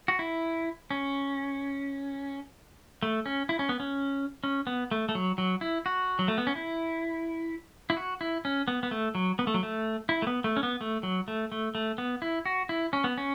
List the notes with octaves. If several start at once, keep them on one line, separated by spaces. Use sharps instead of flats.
F#4
E4
C#4
A3
C#4
E4
C#4
B3
C#4
C#4
B3
A3
A3
F#3
F#3
E4
F#4
F#3
A3
B3
C#4
E4
E4
F#4
E4
C#4
B3
B3
A3
F#3
B3
A3
F#3
A3
E4
A3
B3
A3
C#4
B3
A3
F#3
A3
A3
A3
B3
E4
F#4
E4
C#4
B3
C#4